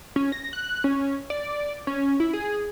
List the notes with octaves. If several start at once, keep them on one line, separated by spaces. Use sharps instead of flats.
C#4
A#6
F#6
C#4
D5
C#4
E4
G#4